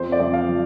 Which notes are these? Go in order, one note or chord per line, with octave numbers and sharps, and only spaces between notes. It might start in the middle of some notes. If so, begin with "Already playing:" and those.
Already playing: F2 C5
D5
F2
F5
F3